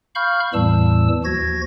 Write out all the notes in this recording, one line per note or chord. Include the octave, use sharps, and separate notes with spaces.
F5 B5 C#6 F6 G6
E2 A2 E3 G3 A5 E6
D#2 F3 F#4 G#6 A#6